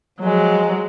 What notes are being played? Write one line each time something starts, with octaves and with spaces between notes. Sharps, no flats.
F3 F#3 G#3